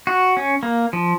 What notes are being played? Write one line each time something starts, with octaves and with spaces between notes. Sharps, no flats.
F#4
C#4
A#3
F3